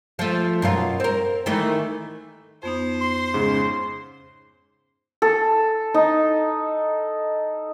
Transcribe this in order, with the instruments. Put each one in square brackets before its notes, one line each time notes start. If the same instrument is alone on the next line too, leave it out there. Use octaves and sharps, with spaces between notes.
[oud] F3 A3
F#2 B2 F4
C4 A#4
D#3 E3 A3
[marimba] F2 B3 D#4 [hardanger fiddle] C5
[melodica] C6
[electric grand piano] G#2 C#3
[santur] A4
D#4